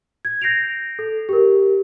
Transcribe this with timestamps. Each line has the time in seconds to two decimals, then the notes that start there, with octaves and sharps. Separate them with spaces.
0.25 G#6
0.42 G6 A#6 C7 D7 F7
0.99 A4
1.29 G4 A#4